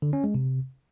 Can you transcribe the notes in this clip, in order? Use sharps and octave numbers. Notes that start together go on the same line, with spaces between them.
D3
C#4
G#3
C3